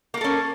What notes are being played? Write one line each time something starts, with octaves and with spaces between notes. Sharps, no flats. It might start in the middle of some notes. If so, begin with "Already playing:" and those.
A#3 C#4 A4 A#4